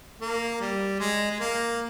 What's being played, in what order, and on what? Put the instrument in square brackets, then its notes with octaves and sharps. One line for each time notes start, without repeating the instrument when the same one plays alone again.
[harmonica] A#3
G3
G#3
G#3
A#3